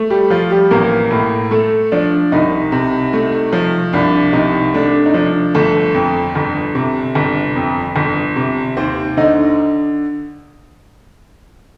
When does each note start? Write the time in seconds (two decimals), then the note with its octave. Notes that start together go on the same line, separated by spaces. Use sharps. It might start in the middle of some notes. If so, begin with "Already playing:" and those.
Already playing: A3
0.10 G3 G4
0.30 F3 F4
0.50 G3 G4
0.71 A1 A#3 A#4
1.11 A2
1.51 A3 A4
1.92 F3 D4 D5
2.32 C2 D#3 D#4
2.72 C3
3.13 A3
3.53 F3
3.93 C2 D4
4.33 C3 D#3 D#4
4.74 A3 D4
5.06 D#4
5.14 F3 D4
5.55 G1 A3 A4
5.94 F2
6.35 G1
6.75 C3
7.15 G1
7.56 F2
7.96 G1
8.36 C3
8.77 D#2 C4 C5
9.17 D3 D#4 D#5